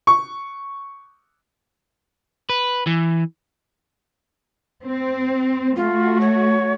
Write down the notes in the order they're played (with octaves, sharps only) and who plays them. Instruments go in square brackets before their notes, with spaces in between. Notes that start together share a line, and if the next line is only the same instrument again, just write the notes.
[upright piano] C#6
[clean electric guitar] B4
E3
[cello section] C4
[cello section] A3 F#4 [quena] F4
[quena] C#5